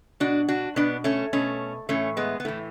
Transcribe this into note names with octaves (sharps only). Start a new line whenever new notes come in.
B2 D4 F#4
D4 F#4
B2 B3 D4
A3 C#4
B2 A3 C#4
A2 E3 A3 C#4
G#3 B3
B3
A2 E3 A3